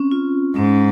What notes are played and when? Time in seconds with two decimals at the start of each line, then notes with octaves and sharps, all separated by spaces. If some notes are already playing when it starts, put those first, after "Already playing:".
Already playing: C4 C#4
0.11 F4
0.56 G#2 C#4